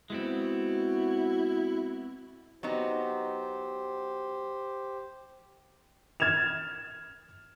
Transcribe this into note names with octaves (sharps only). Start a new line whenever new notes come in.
G#3 B3 C4 E4 F#4
F#3 B3 D#4 G4 C5
F6 G#6 A6 E7 F7